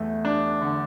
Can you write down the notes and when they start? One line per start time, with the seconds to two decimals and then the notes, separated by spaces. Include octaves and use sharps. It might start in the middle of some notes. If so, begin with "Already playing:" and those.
Already playing: E2 A3
0.25 D4
0.61 D3